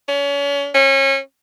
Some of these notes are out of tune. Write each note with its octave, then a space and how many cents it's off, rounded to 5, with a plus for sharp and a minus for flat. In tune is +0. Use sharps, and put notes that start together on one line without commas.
C#4 +35
C#4 -30